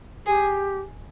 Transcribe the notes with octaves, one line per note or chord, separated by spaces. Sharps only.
G4 G#4